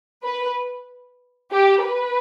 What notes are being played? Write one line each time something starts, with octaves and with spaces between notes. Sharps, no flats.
B4
G4
B4